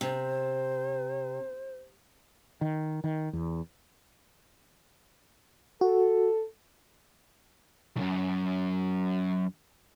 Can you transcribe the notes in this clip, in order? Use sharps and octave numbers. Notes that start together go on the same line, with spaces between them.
C3 C5
D#3
D#3
E2
F#4 A4
B1 F#2